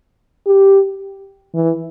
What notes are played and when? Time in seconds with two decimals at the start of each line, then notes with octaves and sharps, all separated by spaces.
0.46 G4
1.55 E3